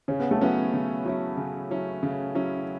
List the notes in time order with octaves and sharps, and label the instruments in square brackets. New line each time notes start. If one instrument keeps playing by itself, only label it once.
[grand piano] C#3 [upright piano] C#4
[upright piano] B3
A3
[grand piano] F#3 C#4 E4 [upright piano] B3
[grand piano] C#3
F#3 C#4 E4
C#3
F#3 C#4 E4
C#3
F#3 C#4 E4